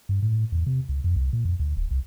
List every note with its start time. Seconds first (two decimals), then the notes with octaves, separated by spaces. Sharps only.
0.09 G2
0.22 A2
0.52 E2
0.67 C3
0.89 C#2
1.04 F2
1.16 C2
1.33 A#2
1.45 F2
1.60 D2
1.77 D1
1.91 C2